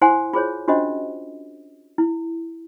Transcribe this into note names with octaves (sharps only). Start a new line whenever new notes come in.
E4 C5 F#5 G#5 C6
F4 G#4 C5 C#5
C#4 D4 F4 F#4 C5 D#5
E4